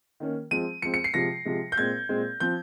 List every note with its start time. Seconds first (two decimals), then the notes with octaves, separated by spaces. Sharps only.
0.20 D#3 A#3 C#4
0.51 F3 G#3 C4 D#7
0.82 F3 G#3 C4 C#7
0.94 C#7
1.04 C7
1.14 C3 F3 G#3 A#6
1.45 C3 F3 G#3
1.72 G6
1.77 A#2 G#3 C4 G#6
2.09 A#2 G#3 C4
2.40 F3 C4 G6